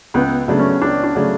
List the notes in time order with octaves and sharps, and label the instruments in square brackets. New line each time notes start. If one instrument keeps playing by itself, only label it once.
[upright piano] C#2 [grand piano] B3
[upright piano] C#3 F#3 A3 D4
[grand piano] C#4
[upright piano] C#2 [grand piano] D4
[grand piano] D4
[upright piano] C#3 F#3 A3 D4